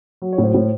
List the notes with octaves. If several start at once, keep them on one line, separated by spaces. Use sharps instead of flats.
F#3
C#5
A2
C5
A2